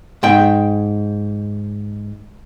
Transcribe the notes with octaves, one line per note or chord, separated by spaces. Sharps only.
G#2 G5